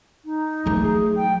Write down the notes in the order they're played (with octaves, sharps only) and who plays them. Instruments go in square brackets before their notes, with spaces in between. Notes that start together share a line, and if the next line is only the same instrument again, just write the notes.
[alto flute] D#4
[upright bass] F#3 A3
[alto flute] G#4
G5